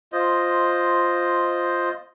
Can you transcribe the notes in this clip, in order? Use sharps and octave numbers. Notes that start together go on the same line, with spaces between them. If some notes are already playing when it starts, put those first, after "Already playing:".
F4 C5 D#5